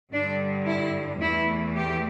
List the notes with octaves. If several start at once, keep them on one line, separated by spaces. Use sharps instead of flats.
G2 D3 G3 D4
E4
E2 E3 A3 E4
G4